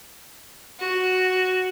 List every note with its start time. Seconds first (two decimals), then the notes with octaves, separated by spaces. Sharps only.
0.79 F#4